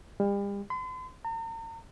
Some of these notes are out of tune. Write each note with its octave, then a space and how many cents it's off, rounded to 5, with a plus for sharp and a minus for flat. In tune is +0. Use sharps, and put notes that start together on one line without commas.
G3 +40
C6 -45
A#5 -40